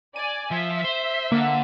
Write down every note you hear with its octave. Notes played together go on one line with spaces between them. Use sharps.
D5 G#5 D#7
F3 E5
C5
D3 A#3 C5 F5 F#5 E6